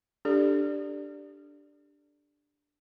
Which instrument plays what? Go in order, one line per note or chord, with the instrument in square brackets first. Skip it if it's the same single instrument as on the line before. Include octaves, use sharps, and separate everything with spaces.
[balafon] D4 G4 A4 D5